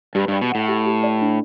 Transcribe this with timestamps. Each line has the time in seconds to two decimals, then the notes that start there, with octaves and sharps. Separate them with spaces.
0.15 G2 G4
0.28 G2 D5
0.41 B2
0.50 A2 F#5
0.68 G4
0.86 G4
1.03 D5
1.21 D4